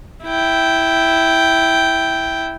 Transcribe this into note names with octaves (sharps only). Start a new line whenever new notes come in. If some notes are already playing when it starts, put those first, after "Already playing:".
E4 G5